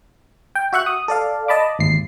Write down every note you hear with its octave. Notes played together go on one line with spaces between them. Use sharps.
G5
F#4 E5 C#6 F#6
D#6
A4 D5 F5
D#5 A5 B5 D6
G#1 D#2 C7